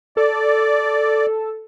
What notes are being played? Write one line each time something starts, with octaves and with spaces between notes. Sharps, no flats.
A4 D5